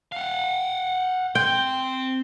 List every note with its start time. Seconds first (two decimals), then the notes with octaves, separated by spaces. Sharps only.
0.12 F5 F#5
1.35 C4 G5 C6